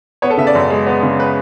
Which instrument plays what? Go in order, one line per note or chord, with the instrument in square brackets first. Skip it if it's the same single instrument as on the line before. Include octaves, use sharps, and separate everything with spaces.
[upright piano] B3 [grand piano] C#5
[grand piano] A4
[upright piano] C#3 [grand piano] E5
[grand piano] D5
[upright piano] F#2
G#3
B3
C#3
[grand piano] B4